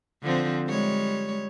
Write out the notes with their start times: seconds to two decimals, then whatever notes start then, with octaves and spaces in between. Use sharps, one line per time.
0.23 D3 F3 C4
0.67 G3 G#3 C#5